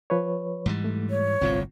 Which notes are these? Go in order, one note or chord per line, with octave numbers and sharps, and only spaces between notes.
F3 B4 C#5
G#2 E3 G3
A3
C#5
G1 C2 A2 C4 F4